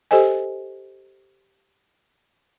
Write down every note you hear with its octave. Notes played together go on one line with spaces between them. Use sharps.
G4 A4 C5 D#5 G#5